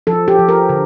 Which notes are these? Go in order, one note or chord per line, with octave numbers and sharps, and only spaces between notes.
F3 A4
G4
F3
A#4
D3